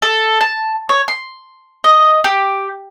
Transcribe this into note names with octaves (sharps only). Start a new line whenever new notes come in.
A4
A5
C#5
C6
D#5
G4